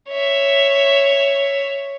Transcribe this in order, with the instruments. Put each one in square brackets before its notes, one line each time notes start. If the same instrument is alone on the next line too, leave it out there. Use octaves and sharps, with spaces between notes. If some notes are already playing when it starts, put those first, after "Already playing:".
[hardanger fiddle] C#5 E5